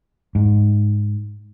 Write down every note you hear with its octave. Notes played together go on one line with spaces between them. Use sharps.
G#2